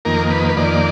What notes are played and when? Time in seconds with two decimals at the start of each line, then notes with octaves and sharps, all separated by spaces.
0.05 F2 D#3 A#3 A#4
0.30 B4
0.49 B4
0.56 F2 D#3 A#3 D5